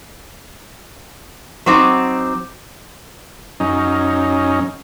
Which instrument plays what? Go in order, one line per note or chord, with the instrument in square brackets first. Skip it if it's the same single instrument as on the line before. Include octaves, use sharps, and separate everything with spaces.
[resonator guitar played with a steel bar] F#3 C4 D#4 [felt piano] C#6 D6
[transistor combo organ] F#2 C#4 D#4